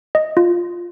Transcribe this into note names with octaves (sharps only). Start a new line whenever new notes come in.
D#5
F4